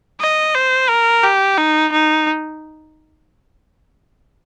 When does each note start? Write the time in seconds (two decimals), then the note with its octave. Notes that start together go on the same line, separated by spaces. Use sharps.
0.21 D#5
0.55 C5
0.90 A#4
1.24 G4
1.58 D#4
1.93 D#4